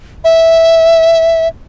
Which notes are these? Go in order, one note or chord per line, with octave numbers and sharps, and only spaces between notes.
E5